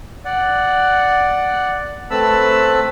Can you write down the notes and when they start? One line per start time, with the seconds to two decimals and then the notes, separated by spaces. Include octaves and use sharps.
0.25 D5 F#5
2.11 A3 C4 B4 A5 B5 E6